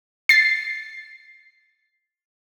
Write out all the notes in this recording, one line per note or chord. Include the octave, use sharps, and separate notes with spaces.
A6 C7